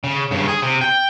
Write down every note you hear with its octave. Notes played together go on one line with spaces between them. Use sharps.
C#3
G2 C#3
G#4
C3
G5